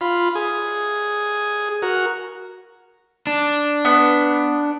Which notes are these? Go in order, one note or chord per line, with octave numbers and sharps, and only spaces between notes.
F4 B5
G#4
F#4 A#4
D4
B3